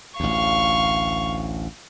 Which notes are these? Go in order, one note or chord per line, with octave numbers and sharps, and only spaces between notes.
A1 D2 F5 C#6